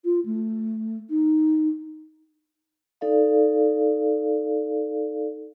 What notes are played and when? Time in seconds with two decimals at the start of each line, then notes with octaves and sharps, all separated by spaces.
0.05 F4
0.26 A3
1.10 D#4
3.01 D#4 A4 D5 F5